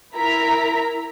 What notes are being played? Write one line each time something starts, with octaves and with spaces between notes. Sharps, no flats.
E4 A#4 A#5 B6